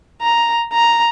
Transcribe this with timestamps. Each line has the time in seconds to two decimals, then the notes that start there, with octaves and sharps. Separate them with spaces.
0.22 A#5
0.73 A#5